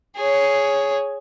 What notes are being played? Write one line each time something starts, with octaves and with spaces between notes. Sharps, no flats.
G#4 C#5